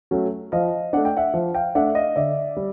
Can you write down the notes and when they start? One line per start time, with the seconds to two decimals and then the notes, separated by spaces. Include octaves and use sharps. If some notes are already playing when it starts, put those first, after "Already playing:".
0.11 F#3 A3 C#4
0.52 F3 D#5 F5
0.93 A3 D4 F#5
1.05 G5
1.17 E5 F#5
1.34 F3
1.54 F5 G5
1.75 A3 D4 E5 F#5
1.95 D#5 F5
2.16 D3 D5 E5
2.57 G3